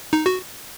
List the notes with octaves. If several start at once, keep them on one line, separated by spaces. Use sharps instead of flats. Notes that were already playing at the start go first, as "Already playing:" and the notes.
D#4
F#4